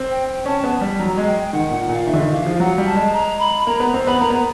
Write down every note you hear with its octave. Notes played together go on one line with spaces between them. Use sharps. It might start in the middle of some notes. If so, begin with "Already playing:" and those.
Already playing: C4
G5
G5
C#4 A5
B3
G3
F#3 A#5
G#3
G5
D#3 F#5
A#2 F#5
F#5
A#2
F5
D#3 E5
D3
D#3
E3 F5
F3
F#3 F#5
G3
A5
G#3
A#5
B5
A#3 A#5
B3 A#5
C4
B3 B5
A#3 A#5
B3